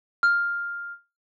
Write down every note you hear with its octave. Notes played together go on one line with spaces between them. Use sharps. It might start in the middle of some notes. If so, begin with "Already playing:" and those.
F6